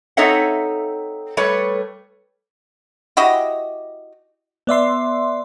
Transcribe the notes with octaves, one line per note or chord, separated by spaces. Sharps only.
C4 D#4 A4 C#5 E5 F#5
G3 A3 B4 C#5
E4 F#4 G4 D#5
B3 D5 E5 C6